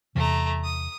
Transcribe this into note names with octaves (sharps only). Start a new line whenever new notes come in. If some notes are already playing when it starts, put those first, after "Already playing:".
E2 C3 E3 A3 A#5
D#6